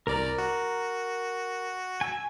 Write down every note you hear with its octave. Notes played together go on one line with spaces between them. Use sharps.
C2 A#4 D5 A#5
F#4
G#5 E6